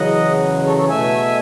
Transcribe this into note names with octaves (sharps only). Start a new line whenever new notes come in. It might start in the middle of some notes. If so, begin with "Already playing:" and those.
Already playing: E2 C#3 F#3 D#5 F#5
A4 C#5
A4 C#5
B2 A3 E5 G#5